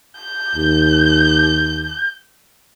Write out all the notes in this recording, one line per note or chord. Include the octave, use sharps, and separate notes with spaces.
G6
D#2